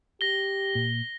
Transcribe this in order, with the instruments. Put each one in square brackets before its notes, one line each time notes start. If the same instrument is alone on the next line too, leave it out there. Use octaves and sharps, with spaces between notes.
[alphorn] G4 [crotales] A#6 G7
[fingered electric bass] A#2